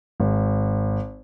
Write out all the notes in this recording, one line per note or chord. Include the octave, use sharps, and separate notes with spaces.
G#1